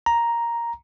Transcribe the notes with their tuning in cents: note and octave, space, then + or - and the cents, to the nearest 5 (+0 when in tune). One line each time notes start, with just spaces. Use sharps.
A#5 +5